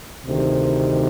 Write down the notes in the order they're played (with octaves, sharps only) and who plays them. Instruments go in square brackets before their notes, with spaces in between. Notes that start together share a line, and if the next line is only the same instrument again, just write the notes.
[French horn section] D2 C3 D#3